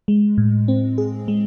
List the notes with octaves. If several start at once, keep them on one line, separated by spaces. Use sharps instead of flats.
G#3
A2
C4
G#4
G#3